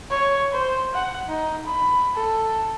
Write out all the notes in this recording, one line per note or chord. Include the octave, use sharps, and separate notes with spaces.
C#5
C5
F#5
D#4
B5
A4